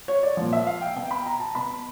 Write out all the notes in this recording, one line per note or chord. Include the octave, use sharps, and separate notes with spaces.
C#5
D5
A#2 F3
E5
F5
G5
B2 G5
B5
A#5
A5
B2 B5